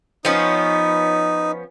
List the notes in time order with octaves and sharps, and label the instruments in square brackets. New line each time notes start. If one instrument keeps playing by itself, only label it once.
[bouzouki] F3 B3 C#4 [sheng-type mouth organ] D#4